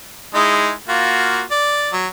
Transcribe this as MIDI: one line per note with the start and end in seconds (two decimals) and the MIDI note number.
0.34 0.72 56
0.34 0.72 63
0.34 0.72 64
0.88 1.43 58
0.88 1.43 65
0.88 1.43 66
1.51 1.91 74
1.93 2.07 54